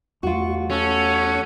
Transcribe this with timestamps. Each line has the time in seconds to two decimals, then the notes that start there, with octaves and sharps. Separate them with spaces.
0.23 E2 A3 F4 F#4 C#6
0.70 C#4 A4 C#5 F#5